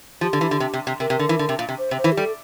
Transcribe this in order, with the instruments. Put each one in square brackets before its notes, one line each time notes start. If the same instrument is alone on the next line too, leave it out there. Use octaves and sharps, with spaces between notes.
[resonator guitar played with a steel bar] F3 [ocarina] G4
[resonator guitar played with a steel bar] D3
E3
D3
C3
C3
C3
[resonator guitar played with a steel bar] C3 [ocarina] A#4
[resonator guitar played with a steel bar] C3
D3
E3
D3
C3
A#2
C3
[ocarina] C5
[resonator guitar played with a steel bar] C3
[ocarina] C5
[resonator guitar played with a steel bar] E3
[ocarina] G4
[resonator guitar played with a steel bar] G3 [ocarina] A4